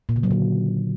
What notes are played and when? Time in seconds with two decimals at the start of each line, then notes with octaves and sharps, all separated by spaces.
0.09 A#2
0.16 C#3
0.23 F#3
0.31 D3